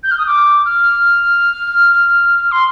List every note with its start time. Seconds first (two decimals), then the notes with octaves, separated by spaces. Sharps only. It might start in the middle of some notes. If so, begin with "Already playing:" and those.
0.03 G6
0.11 F6
0.18 D#6
0.26 D6
0.65 F6
2.51 C6